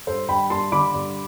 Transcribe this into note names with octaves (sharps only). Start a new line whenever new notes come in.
G2 A4 C5
G2 G5 B5
G2 A5 C6
D3 B5 D6
G2